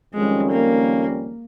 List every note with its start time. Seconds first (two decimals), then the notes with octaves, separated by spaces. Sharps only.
0.13 F2 D#3 G3 G#3 C#4
0.52 A#3